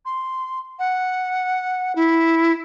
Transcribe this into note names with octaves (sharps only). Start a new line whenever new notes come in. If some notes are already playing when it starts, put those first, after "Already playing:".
C6
F#5
E4